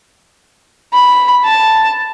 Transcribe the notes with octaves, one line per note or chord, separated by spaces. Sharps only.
B5
A5